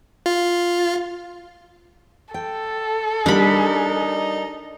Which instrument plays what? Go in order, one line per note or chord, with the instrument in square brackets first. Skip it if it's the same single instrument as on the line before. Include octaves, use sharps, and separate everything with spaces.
[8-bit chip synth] F4
[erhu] A4 [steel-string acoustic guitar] G5
[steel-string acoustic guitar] G3 A#4 [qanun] D4 B5 [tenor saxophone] D#4